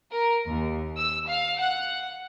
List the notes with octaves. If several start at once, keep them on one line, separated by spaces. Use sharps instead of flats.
A#4
D#2
E6
F5
F#5